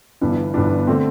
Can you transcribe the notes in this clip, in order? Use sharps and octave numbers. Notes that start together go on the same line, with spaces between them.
G1 G2 E3 B3 D4
G1 G2 E3 B3 D4
D3 A3 C4